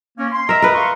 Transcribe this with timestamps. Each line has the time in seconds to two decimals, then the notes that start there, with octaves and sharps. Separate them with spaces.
0.18 A#3 C#4
0.32 C6
0.49 A#4 D#5 E5 A#5
0.62 A#4 B4
0.74 F5 C6 C#6